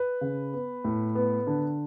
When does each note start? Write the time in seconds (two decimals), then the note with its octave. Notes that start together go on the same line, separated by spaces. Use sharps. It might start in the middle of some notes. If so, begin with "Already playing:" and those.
Already playing: B4
0.21 C#3
0.54 B3
0.84 A2
1.15 B3
1.47 D3